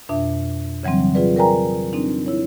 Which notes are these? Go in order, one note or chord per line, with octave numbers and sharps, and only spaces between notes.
F2 B2 D4 E5
C#3 E3 F#3 G3 C4
F4 G#4 B4 D5
A#4 B4 D5 G5 G#5 A#5
C4 D4 D#4
E4 C#5